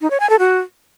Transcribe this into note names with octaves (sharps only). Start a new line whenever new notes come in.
D#4
C#5
G#5
A4
F#4